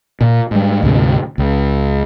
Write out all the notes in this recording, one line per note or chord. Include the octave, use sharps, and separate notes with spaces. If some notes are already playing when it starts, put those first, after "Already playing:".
A#2
G#2 G3
D2 G#2 C3
C#2